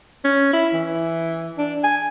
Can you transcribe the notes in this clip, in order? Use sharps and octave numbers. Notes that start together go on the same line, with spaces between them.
C#4
E4
E3
D4
G#5